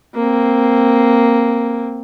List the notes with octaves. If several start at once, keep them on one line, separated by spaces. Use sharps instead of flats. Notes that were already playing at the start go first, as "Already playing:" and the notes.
A#3 C4